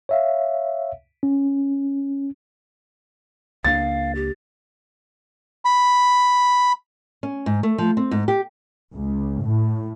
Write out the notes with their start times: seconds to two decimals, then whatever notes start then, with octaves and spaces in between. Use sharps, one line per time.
0.09 C#5 E5 F5
1.23 C#4
3.65 C#2 A#3 D4 F5 A6
4.15 G4
5.65 B5
7.23 C#4
7.46 G#2
7.63 A3
7.78 F3
7.97 C4
8.11 G#2
8.28 G4
8.94 C#2
9.45 A2